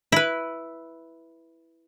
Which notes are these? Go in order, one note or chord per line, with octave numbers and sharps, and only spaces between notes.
E4 B4